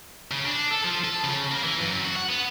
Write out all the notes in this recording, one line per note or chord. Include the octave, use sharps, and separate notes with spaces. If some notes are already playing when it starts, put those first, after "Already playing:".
C#3
D4
A4
F3
A4
C#3
A#3
E3
F#2
F#4
F#5
B3